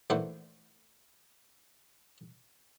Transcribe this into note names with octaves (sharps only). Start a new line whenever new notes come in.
A#1 E3 A3 C5 D5 F#5